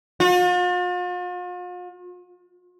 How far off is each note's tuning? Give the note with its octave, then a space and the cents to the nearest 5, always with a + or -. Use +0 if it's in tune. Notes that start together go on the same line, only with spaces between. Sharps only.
F4 +45